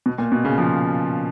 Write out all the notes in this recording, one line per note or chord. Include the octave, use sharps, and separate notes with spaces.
B2
A#2
B2
A#2 C#3
C#3 F3